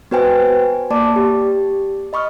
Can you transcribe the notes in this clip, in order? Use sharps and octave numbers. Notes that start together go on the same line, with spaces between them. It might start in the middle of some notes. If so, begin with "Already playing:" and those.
B3 F#4 B4 C5 G5 G#5
A#3 D5 A5 D6
G4
D#5 B5 C#6 D#6 F6